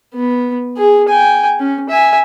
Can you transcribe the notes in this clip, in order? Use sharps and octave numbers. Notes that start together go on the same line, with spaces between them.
B3
G#4
G5 G#5
C#4
E5 G#5